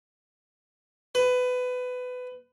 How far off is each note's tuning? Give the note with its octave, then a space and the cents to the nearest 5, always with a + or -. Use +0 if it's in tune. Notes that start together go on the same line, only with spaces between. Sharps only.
B4 +20